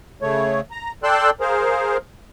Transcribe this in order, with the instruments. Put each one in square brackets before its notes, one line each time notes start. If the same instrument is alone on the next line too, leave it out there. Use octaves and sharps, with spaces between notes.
[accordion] C#3 A3 C#5
A#5
A4 D5 G5 C6 E6 F#6
G#4 A#4 C5 F5